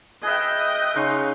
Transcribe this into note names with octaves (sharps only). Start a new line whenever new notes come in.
G#4 B4 D#5 E5 G5 F#6
C#3 D#4 C6 C#6